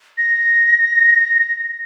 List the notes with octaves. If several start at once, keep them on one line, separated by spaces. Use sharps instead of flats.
A#6